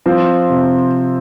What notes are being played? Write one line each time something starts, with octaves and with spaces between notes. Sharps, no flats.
F3 C4
C3